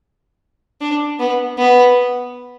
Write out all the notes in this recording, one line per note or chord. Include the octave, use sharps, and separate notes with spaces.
D4
B3
B3